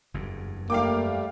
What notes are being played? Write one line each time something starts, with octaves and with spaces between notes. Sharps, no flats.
F#1 E2 G2
G3 A3 A#3 F5 G5 D6